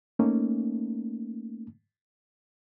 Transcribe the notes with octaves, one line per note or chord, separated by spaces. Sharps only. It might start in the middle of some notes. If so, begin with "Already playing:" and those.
A3 A#3 C#4 D#4